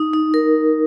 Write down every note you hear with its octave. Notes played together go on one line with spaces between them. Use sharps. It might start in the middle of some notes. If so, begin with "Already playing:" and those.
Already playing: D#4
D#4
A#4